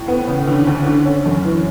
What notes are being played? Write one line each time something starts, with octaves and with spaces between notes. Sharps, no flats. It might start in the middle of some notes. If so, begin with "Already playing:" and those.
Already playing: A2
B3
C#3
D3
D2
D3
C#4
F#2
E3